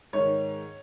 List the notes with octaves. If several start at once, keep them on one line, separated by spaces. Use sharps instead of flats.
G#2 D#3 C#5